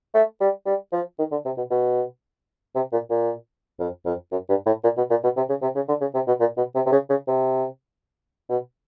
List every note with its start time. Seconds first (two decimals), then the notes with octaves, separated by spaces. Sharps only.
0.14 A3
0.41 G3
0.66 G3
0.92 F3
1.19 D#3
1.31 D3
1.45 C3
1.57 B2
1.71 B2
2.75 C3
2.92 A#2
3.10 A#2
3.79 F2
4.05 F2
4.31 F#2
4.49 G2
4.66 A2
4.84 A#2
4.97 B2
5.10 A#2
5.23 B2
5.36 C3
5.49 C#3
5.62 C3
5.75 C#3
5.88 D3
6.01 C#3
6.14 C3
6.27 B2
6.40 A#2
6.57 B2
6.75 C3
6.86 C3
6.92 C#3
7.10 C#3
7.28 C3
8.49 B2